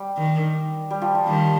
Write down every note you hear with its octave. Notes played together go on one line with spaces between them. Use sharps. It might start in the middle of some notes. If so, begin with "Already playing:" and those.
Already playing: G3
D#3
G3
F3
F3
D#3 G3